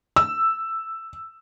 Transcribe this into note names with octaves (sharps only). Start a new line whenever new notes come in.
E6